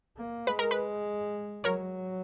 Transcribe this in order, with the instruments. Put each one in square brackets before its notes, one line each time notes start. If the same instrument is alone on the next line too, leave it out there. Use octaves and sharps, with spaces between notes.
[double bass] A#3
[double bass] G#3 [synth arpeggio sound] B4
[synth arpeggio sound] A#4
B4
[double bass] F#3 [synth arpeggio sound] A#4 C#5